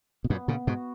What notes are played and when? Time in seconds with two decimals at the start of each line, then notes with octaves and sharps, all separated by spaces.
0.24 B2
0.30 F#2 A#2 B3
0.48 A#2 C#3
0.67 G#2 B2 F#4